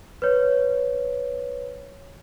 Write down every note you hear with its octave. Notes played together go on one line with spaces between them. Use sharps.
B4 C#5